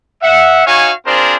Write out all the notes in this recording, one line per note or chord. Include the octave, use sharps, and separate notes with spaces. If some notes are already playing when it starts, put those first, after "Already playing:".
E5 F#5
D#4 F#4 C#5 F5 G#5
C4 D4 F4 G#4 A#4 C5